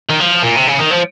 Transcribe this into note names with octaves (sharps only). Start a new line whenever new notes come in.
D#3
F3
A#2
C3
C#3
D#3
F3